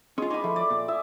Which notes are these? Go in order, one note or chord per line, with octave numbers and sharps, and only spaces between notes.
G#3 C#4 F4
D#4 G#4 D#5 B5 C6 D6
F3 A3
D5
A#2
E5 G#5 D#6